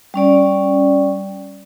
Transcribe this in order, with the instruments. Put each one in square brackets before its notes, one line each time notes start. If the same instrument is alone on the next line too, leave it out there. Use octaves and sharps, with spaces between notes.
[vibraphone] G3 C#4 D5